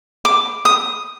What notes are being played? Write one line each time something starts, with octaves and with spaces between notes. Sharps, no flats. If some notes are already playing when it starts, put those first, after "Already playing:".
D6
D#6